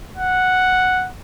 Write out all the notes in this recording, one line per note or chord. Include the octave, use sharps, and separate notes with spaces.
F#5